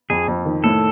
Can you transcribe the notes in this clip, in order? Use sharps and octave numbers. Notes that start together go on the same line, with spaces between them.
F2 G#4
F2
D#3
A2 A4